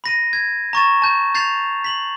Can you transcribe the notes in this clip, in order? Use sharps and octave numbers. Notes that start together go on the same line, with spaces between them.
B5 A#6 D#7
G#6
A#5 C#6 A6 E7
A5 G6
G6 A6 C7 F7
B6 F#7